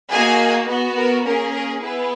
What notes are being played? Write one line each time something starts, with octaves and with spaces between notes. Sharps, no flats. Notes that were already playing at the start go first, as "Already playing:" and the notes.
A#3 D#4 F#4 G#4 G#5
B3 F#4
A#4
A#3 C#4 G#4 A#4
A#4
B3 E4 G#4 B4